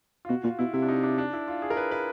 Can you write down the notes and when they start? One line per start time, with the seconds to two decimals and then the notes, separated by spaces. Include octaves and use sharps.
0.25 F4
0.29 B2 F#4
0.44 A#2 F4
0.59 B2 E4
0.73 C3 E4
0.82 D4
0.88 D#4
1.03 D4
1.18 D4
1.33 E4
1.48 F4
1.62 G#4
1.70 A#4
1.77 B4
1.91 B4